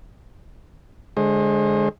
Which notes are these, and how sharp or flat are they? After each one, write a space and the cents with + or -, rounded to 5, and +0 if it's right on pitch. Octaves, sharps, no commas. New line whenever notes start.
D3 +0 G#3 +0 C5 +35